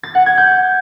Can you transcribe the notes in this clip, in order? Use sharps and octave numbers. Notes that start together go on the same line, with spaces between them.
A6
F#5
G#6
G6